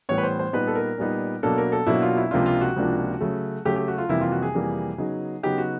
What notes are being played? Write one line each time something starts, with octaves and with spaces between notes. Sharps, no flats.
A2 E3 G3 B3 C#5
B4
C5
C5
A#2 G3 B3 D#4 B4
A4
A#4
A#2 G3 B3 D#4
B2 F#3 A#3 D4 A4
A#4
A4
B2 F#3 A#3 D4 E4
F4
E4
C#2 C3 F3 A#3 D4 F4
F4
F#4
C#2 C3 F3 A#3 D4
C#3 F#3 A3
C#3 F#3 A3 G4
G4
F#4
F4
F2 C3 E3 G3 A#3 E4
F4
F#4
G#4
F2 C3 E3 G3 A#3
C#3 F#3 B3 D#4
C#3 F#3 B3 D#4 G4
F#4